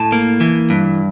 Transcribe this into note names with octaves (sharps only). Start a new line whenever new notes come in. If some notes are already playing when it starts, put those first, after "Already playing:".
Already playing: A2 A5
A#3
E3
G2